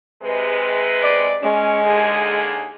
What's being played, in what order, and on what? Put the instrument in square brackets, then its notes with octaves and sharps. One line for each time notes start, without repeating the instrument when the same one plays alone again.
[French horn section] C3 G#3 B4
[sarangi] D5
[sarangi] G#3 [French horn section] C#4
[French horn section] D#2 D3 G#4